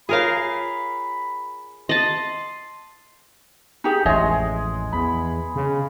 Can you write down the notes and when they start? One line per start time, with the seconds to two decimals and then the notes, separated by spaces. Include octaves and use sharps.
0.09 F4 G#4 A#4 C#5 F5 B5
1.89 D#5 A5 C6
3.84 D#4 G4 G#4
4.06 A1 F2 G#3 G#4 C#5 D#5 E5
4.93 E2 B5
5.56 C#3